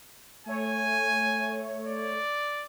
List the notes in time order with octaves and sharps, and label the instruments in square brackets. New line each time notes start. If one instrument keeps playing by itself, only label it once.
[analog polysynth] A3 C#5 [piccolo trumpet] G#5
[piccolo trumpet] D5